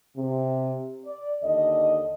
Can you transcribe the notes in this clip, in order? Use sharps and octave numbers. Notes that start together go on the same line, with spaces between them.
C3
D5
D#2 D3 D#5